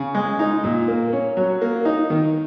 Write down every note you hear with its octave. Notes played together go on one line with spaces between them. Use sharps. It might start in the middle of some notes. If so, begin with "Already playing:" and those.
Already playing: C#3
G#3
D#4
A#2
A#3
C#4
F#3
A#3
D#4
D#3